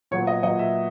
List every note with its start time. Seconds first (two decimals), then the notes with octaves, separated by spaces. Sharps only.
0.11 A#2 F#3 B3 C#5
0.27 D#5
0.43 A#2 F#3 B3 D#5
0.59 E5